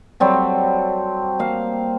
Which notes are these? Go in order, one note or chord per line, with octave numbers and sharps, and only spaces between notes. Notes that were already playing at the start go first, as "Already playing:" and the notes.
F#3 G3 C4 A4
A#3 F5